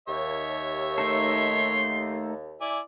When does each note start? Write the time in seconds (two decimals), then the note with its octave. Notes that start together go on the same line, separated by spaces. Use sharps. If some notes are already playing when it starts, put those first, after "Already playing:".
0.08 D#2 C#5 E5
0.98 A3 D#4 A4 C6
2.61 E4 D5 G#5